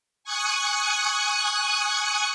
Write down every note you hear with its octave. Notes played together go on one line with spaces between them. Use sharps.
G#5 C#6 D#6 F#6 C#7